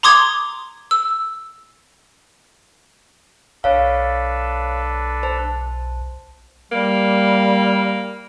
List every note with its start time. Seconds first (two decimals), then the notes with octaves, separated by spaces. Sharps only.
0.03 A#5 C6 D6 D#6 G#6
0.91 E6
3.64 B1 D4 A4 B4 C#5 F5
5.23 C5 A5
6.71 G3 A#3